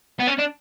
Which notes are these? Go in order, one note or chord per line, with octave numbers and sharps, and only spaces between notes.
B3
C#4
D4